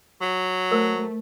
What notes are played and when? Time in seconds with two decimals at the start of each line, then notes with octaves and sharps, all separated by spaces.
0.22 F#3
0.71 A3 A#4 C5